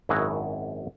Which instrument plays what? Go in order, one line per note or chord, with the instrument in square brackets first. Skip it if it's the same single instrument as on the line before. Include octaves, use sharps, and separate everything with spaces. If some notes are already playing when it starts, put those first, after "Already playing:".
[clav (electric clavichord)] G#1 F#2 E4 F#4 G#4 D#5